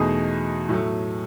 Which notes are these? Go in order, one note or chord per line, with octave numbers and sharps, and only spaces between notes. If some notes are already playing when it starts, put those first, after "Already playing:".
Already playing: E2 B2 A3 D#4 G#4
A2 F#3 A3